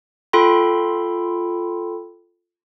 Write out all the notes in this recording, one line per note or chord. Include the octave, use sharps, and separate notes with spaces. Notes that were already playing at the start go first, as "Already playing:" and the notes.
F4 A4 G5 B5 C6